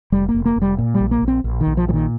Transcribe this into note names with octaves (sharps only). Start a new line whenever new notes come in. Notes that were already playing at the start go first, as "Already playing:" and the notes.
F1 G3
A#3
F1
A#3
F1
G3
A#2
G3
A#1
A#3
A#1
C4
A#1
D#3
A#1
F3
A#2 F3
D#3